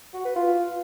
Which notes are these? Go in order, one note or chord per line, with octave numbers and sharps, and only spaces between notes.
F#4
B4
F4